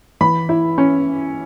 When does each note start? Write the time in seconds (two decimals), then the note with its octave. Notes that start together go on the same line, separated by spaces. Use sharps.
0.21 E3 B5
0.49 E4
0.78 C#4